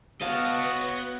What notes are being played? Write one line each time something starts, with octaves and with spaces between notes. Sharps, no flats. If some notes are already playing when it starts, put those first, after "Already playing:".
B3 F#4 C#5 D#5 F5 A5